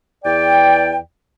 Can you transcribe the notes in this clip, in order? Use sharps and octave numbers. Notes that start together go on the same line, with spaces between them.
E2 D5 G5